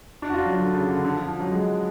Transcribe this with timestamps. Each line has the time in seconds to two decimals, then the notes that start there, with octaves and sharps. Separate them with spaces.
0.22 D4
0.29 F#4
0.34 F4
0.46 F#3
0.58 D3
0.73 C#3
0.89 D3
1.05 D3
1.16 F3
1.28 F3
1.40 F#3
1.52 G#3